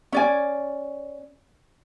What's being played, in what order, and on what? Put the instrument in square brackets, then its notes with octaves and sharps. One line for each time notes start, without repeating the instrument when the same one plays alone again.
[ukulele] C#4 D5 G#5